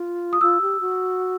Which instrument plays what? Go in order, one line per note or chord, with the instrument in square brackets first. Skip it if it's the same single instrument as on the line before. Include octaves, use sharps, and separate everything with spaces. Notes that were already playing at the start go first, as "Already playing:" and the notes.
Already playing: [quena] F4
[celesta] D#6
[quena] F4 [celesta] E6
[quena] G4
F#4